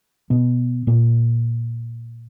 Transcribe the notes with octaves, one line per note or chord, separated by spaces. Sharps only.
B2 B3
A#2 A#3